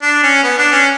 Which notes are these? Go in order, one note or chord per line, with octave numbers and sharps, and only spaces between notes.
D4
C#4
B3
D4
C#4